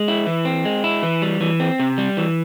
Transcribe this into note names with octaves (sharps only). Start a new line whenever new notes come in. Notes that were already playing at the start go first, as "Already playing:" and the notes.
Already playing: G#3
E4
E3
C4
G#3
E4
E3
G3
E3
C4
C3
G3
E3